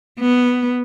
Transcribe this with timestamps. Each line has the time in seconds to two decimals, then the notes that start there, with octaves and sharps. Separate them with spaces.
0.20 B3